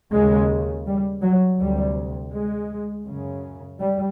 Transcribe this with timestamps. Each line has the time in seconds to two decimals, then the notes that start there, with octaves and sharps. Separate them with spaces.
0.13 D#2 C#3 G#3
0.87 G3
1.22 F#3
1.59 D2 C3 G3
2.33 G#3
3.05 F#2 C#3
3.79 G3